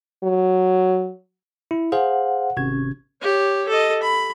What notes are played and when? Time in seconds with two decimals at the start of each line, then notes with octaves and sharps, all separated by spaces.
0.23 F#3
1.71 E4
1.92 G#4 C5 F5 F#5
2.57 G#1 C3 C#4 G#6
3.22 G4 C#5
3.69 A4 D#5
4.02 B5